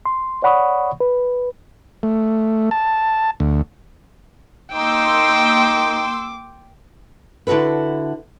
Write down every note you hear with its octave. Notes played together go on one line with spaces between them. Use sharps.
C6
C#5 D5 F#5 B5 C#6 D#6
B4
A3
A5
D2
A#3 D#4 G5 C6 D6 E6
D3 E4 F#4 A4 B4